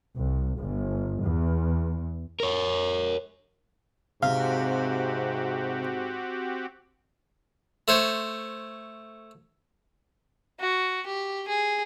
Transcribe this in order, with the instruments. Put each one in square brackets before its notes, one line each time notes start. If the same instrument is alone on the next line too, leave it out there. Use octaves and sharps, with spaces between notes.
[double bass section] C2
G1
E2
[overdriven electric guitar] A#4 C#5
[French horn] G#2 [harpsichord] C3 [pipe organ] C4 F#4 G4 [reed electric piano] F5
[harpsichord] A3 C5 C#5
[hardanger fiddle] F#4
G4
G#4